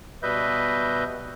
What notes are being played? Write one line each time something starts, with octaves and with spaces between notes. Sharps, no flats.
B2 G3 B4 D#5 E5 G6